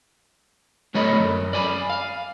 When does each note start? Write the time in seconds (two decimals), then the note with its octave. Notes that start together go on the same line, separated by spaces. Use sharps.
0.94 A2 F#3 A3 C#5 D#5 B5
1.19 F#2
1.53 D5 G#5 B5
1.90 F5